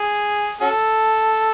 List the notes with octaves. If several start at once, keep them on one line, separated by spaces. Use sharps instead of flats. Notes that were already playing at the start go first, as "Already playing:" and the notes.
Already playing: G#4
C#4 F#4 A4